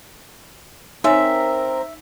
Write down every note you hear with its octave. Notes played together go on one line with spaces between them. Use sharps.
C4 D#4 A#4 C#5 E5 G#5